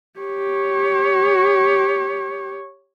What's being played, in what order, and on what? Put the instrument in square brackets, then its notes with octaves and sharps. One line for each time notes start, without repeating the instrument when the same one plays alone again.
[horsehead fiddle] G4 C#5